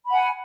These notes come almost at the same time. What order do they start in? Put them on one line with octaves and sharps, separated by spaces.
B5 F#5 G#5